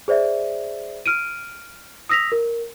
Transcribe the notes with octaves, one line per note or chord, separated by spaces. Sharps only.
G#4 C5 D5 E5
F6 D7 D#7
D#6 E6 A#6 B6 F7
A#4